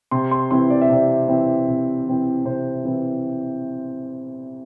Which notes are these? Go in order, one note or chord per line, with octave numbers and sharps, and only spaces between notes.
C3 C6
C6
E3 C4 E4 C6
D5
E5
C3 D5
E3 C4 E4
C3
E3 C4 E4
C3 C5
E3 C4 E4